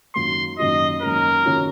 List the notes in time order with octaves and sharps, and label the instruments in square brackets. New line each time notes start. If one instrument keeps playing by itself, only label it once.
[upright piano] F#2 D#3 A#3 C#4 F#4 [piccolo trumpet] C6
[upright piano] F#2 D#3 A#3 C#4 F#4 [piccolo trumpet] D#5
[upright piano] F#2 D#3 A#3 C#4 F#4 [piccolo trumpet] A#4
[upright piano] D#3 A#3 C#4 F#4